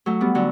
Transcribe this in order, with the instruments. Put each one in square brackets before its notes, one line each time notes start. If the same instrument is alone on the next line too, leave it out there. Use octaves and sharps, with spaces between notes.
[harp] F#3 A3
G3 B3
D3 F#3